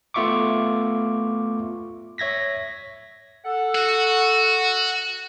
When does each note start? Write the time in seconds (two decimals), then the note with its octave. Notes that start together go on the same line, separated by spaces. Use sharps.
0.14 A3 B3 F4 E5 C#6 D6
2.18 C#5 E5 G#6 A#6 B6
3.45 A4 F#5
3.75 F#4